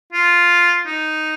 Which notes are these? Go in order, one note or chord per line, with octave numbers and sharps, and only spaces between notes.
F4
D#4